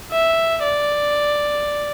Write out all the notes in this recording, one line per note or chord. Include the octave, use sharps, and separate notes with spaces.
E5
D5